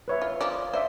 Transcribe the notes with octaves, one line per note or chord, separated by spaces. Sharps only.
B4 C#5 E5
F4
F3 D5
C5 D5 E5